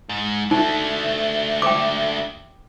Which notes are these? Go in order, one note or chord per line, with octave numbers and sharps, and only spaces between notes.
G#2
D3 A3 D#4
G5 D6